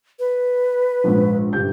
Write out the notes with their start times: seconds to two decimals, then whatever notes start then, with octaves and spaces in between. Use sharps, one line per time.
0.19 B4
1.04 A#1 G#2
1.53 G1 G4 G6